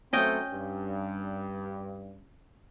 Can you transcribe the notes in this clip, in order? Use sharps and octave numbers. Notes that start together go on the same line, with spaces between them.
F#3 A3 C4 C#4 D#5 G5
G2